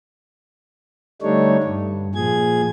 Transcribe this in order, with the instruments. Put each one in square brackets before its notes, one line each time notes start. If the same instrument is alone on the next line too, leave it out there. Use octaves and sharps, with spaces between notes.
[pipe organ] D3 G3 A3 D4 D#4 C#5
G2
A#2 F3 G#4 G#6